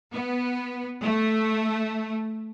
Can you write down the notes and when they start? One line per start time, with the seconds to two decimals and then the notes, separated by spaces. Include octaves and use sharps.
0.13 B3
1.02 A3